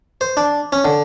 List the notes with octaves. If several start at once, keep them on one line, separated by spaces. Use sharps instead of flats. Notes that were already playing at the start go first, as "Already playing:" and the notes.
C5
D4
C#4
D3